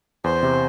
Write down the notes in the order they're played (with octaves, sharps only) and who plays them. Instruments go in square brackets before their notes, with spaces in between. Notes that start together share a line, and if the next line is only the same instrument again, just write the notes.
[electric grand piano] E2 [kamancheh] C5
[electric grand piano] C3